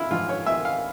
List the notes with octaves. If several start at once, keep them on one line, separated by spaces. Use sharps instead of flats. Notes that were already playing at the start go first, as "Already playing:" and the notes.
Already playing: G#1 E4 F4
G#2 F3 F4
C#5
G#1 E5
F5